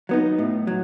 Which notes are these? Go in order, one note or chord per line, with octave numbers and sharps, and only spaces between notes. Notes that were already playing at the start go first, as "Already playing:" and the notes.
F#3 B3 D#4
A2
F#3